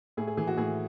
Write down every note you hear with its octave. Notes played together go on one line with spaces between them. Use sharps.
A2 G#4
G#4
E3 G#4
F#4
A2 G#4